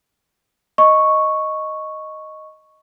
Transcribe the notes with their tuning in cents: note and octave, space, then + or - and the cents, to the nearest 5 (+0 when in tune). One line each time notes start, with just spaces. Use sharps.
D#5 +0 C#6 -5